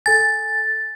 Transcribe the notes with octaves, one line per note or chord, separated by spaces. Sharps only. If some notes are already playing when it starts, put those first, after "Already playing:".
A4 G#5 A6